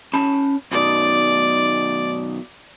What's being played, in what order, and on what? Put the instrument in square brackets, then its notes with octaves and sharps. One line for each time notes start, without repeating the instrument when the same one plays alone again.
[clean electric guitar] C#4 A5 B5
[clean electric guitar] B1 B2 D#3 [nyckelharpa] D5